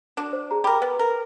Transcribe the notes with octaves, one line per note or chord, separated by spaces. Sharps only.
D4 F#4
C5
G#4 A#5
G4 A#4 B5
B3 B4
A#4